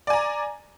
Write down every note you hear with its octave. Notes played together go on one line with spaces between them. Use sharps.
D5 G#5 A#5